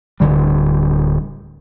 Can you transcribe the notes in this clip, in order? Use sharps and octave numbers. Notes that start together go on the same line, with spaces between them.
D1 D3 G3